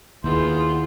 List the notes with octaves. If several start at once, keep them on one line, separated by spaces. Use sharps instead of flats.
D#2 B3 E4 F4 G#4 C5